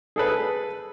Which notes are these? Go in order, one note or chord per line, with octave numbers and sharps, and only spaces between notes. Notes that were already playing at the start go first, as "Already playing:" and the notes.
G#4 A4 B4